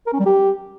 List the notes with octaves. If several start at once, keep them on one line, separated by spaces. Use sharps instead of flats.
A#4
C#4
G3
G4